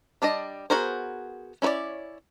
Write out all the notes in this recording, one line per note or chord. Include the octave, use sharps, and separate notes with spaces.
G3 D4 D5 D#5
B3 F#4 G#4 A#4 C5
C#4 E4 B4 C#5 D5